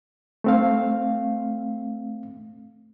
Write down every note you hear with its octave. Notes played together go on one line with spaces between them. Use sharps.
A3 C4 F5